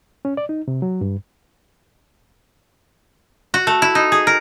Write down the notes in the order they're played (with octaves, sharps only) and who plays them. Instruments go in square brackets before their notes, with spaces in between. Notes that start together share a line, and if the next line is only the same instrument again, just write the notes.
[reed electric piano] C#4
D5
D#4
C3
F#3
G2
[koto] F#4
A3
E4
D#4
G#4
A#4